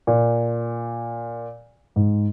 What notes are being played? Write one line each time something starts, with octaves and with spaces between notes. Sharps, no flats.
A#2
G#2